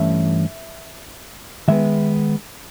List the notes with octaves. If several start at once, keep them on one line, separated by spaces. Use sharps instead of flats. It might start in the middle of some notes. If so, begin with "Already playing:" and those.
Already playing: G2 E3 A3 C#4 E5
D#3 G#3 B3 E5